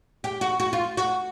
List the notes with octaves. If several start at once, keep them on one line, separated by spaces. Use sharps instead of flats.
G4
F#4
F#4
F4
F#4